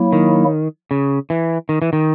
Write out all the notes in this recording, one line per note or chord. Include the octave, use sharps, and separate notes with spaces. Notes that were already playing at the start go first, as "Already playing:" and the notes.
Already playing: F#3 A#3 E4
D#3
C#3
E3
D#3
E3
D#3